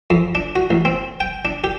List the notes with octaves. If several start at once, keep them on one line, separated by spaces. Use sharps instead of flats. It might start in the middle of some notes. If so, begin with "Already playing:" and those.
F2
D4
F#4
A1
C4
G5
D4
G4